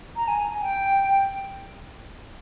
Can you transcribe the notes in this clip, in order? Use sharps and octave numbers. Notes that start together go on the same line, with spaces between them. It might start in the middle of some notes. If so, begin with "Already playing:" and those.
A#5
G#5
G5